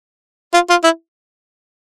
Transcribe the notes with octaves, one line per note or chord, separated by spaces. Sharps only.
F4
F4
E4